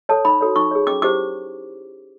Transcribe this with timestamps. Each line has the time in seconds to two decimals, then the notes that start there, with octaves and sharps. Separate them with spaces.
0.09 A4 C#5 A5
0.25 D#4 B5
0.41 F#4 A4 C#5
0.56 D#4 C#6
0.71 G#4 C#5
0.87 C#4 D6
1.02 E4 G4 C5 D6